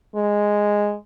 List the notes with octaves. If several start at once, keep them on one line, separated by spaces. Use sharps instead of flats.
G#3